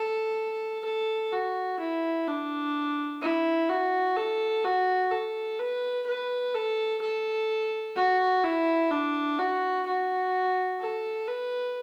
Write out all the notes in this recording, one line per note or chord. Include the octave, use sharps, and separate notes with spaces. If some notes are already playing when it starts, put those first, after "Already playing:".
Already playing: A4
A4
F#4
E4
D4
E4
F#4
A4
F#4
A4
B4
B4
A4
A4
F#4
E4
D4
F#4
F#4
A4
B4